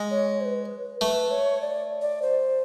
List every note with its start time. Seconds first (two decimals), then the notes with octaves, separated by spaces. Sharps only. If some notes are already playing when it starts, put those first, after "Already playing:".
Already playing: G#3
0.11 C#5
0.41 C5
0.45 B4
1.01 A3 B4
1.31 C#5
1.61 D5
2.01 D5
2.22 C5